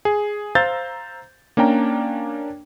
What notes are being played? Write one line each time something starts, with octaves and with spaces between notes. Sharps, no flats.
G#4
C5 F5 A#5 E6 G6 A6
A#3 C#4 D4 G5 A#5